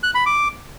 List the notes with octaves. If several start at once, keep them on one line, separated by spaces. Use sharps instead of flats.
F#6
B5
D6